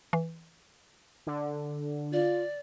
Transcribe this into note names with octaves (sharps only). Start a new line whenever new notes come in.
E3
D3
F4 D5